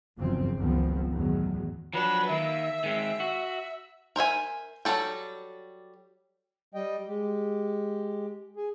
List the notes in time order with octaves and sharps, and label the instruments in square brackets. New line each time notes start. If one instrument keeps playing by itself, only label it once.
[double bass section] F#1 E2 G2 C#3 F3 C4
F#1 C#2 D#3 F3 B3 C4
E2 A2 D#3 F#3
[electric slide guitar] F3 F#3 D4 [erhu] B4
[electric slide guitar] D#3 A#3 [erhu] E5
[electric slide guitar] D#3 G#3 C4
F#4
[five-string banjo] A#4 C5 E5 G#5
F#3 G3 D#4 A4 G5
[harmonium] G3 D#5 G5
G#3 G4
G#4